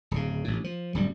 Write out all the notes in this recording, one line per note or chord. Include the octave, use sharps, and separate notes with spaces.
D1 C#3
A1 A2
F3
D1 F#2 G3